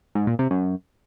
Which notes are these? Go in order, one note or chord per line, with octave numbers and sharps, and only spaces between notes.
G#2
A#2
C3
F#2